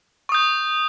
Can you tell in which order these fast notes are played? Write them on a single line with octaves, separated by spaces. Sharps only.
C#6 D#6 G6